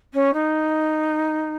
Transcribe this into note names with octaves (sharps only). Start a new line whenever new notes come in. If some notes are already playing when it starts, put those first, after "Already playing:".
C#4
D#4